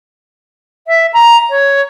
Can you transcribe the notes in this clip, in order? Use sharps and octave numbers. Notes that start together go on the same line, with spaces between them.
E5
A#5
C#5